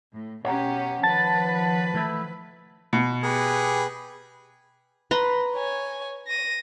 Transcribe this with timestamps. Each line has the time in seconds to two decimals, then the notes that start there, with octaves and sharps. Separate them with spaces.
0.14 A2
0.45 B2 C#4 G4 C#5 F#5 A#5
1.03 D#3 F3 B4 A5 A6
1.94 E3 A3 E4
2.93 B2
3.23 G4 G#4 B4
5.11 B4 A#5 C6
5.55 C#5 G#5
6.27 A#6 D#7